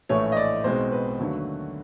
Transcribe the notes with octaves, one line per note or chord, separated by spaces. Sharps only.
A#1 A2 E3 A3 C#5
D#5
D5
B1 B2 G#3 C4 C5
B4
D#2 D3 F#3 A3